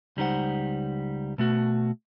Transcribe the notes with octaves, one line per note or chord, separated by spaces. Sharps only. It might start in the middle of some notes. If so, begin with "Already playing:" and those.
C#2 G3 D#4 C5 F#5
B2 A3 F#4